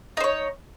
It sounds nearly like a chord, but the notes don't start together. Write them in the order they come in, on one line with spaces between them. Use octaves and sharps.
D#4 C5 C#5